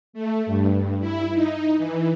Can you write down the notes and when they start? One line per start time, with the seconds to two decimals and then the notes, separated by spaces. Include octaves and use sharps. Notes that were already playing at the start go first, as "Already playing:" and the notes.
0.13 A3
0.46 G2
1.00 E4
1.32 D#4
1.77 E3